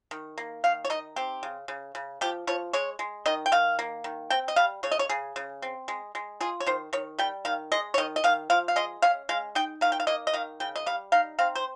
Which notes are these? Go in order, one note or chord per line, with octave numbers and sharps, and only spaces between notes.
D#3
A#3
D#3 F5
C#5
D#4 D#5
C4 G4
C#3
C#3
C#3
F3 G4
F3 C#5
G#3 C#5
G#3
D#3 D#5
G5
D#3 F5
A#3
D#3
C4 G5
D#5
G3 F5
C#3 C#5
D#5
C#5
C#3 G#4
C#3
C4
G#3
G#3
F4 G#4
C#5
D#3 C5
D#3 C#5
G3 G5
D#3 F5
G#3 D#5
C#5
D#3 D#5
D#5
D#3 F5
F3 F5
F5
G#3 D#5
C#4 F5
G#3 F5
D#4 G5
D#3 F5
G5
F5
A#3 D#5
D#5
D#3 F5
C#3 G5
D#5
G3 F5
D#4 F5
C4 F5
C5